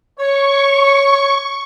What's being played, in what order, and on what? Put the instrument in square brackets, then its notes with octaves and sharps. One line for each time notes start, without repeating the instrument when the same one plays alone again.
[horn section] C#5 [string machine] C#6